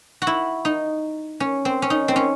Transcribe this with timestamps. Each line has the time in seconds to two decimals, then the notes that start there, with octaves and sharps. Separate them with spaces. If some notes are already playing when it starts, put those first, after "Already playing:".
0.22 F#4
0.27 E4
0.65 D#4
1.40 C#4
1.65 C4
1.82 C#4
1.90 D#4
2.08 C4
2.16 C#4